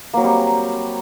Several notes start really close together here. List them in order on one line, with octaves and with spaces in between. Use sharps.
A#3 F#3 C4 G3